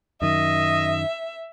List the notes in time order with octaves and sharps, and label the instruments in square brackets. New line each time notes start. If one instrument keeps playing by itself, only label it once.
[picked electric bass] F#2 D#3 [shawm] D#5 [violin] E5